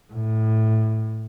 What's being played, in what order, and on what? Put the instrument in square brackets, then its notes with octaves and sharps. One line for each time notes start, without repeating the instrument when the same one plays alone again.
[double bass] A2